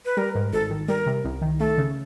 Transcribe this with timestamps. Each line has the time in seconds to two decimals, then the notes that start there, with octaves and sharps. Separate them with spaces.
0.05 B4
0.17 G3 A#4
0.35 G#2
0.53 G#1 A4
0.70 D#3
0.88 G3 A#4
1.06 C3
1.24 C2
1.41 D#3
1.60 A3 A4
1.78 C#3